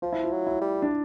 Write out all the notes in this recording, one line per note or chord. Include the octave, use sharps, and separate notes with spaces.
F3 F4
E4
F4
F#3
E4
G3
D4